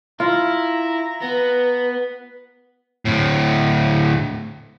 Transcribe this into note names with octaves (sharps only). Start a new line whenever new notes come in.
E4 F4 A#5
B3 B4
D2 A2